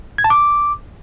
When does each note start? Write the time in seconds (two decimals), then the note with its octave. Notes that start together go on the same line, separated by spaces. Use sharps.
0.18 G#6
0.24 A5
0.30 D6